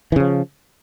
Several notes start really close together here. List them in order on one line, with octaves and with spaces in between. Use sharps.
E3 C#3 F3